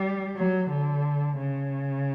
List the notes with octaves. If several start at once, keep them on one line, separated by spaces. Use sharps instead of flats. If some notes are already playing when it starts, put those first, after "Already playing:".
Already playing: G3
F#3
D3
C#3